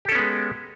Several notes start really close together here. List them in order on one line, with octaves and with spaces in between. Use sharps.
G4 A4 C#4 B3 G#3